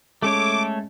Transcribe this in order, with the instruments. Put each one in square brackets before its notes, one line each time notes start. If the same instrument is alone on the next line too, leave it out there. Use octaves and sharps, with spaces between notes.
[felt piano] G#3 C#4 [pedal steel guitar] A3 A4 C#5 [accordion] D6